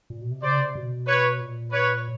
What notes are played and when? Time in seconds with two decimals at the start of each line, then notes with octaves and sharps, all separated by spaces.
0.10 A#2
0.21 B2
0.31 C3
0.42 C#3 C5 D5
0.59 C3
0.75 B2
1.07 B4 C#5
1.40 A#2
1.72 B4 C#5